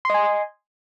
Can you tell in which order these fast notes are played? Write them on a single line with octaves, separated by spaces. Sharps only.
C6 D#5 G#5